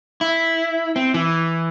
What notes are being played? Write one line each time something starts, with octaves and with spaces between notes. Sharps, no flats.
E4
C4
E3